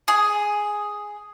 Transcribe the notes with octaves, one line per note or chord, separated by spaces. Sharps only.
G#4